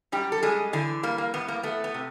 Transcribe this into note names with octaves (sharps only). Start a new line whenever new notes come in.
F#2 G3 G4
A4
G3 G#3 G#4
D3 E3 D4
G3 A#3
A#3
A2 B3
A#3
A3 B3
B3
C3